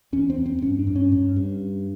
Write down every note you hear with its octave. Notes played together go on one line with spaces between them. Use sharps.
E2 C#4
C4
E2
C4
G2 C#4
D4
G2
C#4
G2
G2